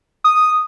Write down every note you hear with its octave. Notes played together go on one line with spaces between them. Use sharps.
D#6